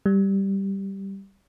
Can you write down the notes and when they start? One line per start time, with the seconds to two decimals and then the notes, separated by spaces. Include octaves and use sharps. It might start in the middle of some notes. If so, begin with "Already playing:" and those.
0.06 G3